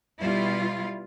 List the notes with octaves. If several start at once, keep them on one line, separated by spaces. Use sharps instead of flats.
B2 G3 E4 F4